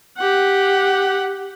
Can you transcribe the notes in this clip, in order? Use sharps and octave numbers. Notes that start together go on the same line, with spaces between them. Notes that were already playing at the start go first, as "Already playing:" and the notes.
G4 F#5